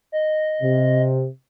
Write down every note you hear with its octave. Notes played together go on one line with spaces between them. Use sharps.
D#5
C3